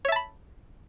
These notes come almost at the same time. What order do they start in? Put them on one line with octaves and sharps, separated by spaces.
C#5 E5 A5 B5